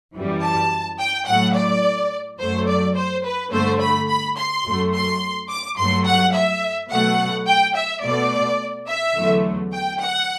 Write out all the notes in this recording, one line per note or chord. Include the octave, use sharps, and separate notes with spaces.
F#2 E3 G3
A5
G5
A2 F#3 A3 F#5
D5
F#2 F#3 A3 C5
D5
C5
B4
G2 D3 A3 C5
B5
B5
C6
F#2 F#3 A3
C6
D6
G2 F#3 A3 C6
F#5
E5
B2 F#3 A3 F#5
G5
E5
B2 A3 D5
E5
E2 D3 F#3 A3
G5
F#5